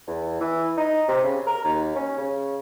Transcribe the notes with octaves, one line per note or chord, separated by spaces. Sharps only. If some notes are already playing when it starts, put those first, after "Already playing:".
E2
E3
D#4
C3
C#3
A#4
D#2
C#4
C#3